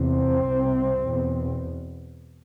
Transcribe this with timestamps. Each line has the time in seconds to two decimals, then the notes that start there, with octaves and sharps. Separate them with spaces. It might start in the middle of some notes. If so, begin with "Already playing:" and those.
Already playing: E2 C3 C4
0.47 C2 C3
1.08 E2 B2